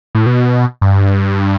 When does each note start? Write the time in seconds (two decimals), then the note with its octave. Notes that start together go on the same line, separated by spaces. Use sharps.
0.15 A2
0.26 B2
0.81 G2